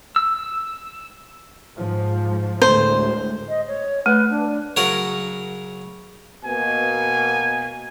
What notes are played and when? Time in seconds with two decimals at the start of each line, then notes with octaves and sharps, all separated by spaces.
0.16 E6
1.75 G#2 F3
2.62 D2 A2 G#3 C5
3.47 D#5
3.68 C#5
4.06 A3 B4
4.30 D4
4.77 C#3 F#3 A#4 F#5
6.45 B2 A#3 G#5